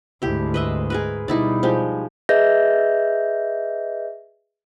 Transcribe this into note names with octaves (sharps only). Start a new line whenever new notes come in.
D2 G#2 E4 G4
B4 D#5 E5
G#4 A#4 B4
B2 G3 D#4 E4 D5
F3 G#3 G4
G#4 B4 D#5 E5 G6 A#6